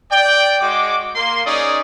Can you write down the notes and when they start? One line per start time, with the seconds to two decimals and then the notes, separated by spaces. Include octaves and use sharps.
0.11 D5 G5
0.61 G#3 F#4 D6
1.16 A#3 C6
1.46 C#4 D#4 G#4 D5 D#6